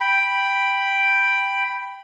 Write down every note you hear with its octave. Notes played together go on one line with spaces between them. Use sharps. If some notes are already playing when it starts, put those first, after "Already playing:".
G5 B5